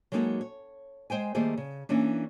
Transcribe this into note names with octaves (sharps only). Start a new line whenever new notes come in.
F#3 G#3 A#3 D#4 F#4 A4
C#5
G#3 C5 G5 G#5
D#3 G3 A3 A#3 G#4 C5
C#3
E3 A#3 C#4 D4